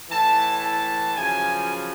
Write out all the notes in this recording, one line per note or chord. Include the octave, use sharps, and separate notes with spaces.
A2 E3 A5
A5
F#2 C#3 F3 G#5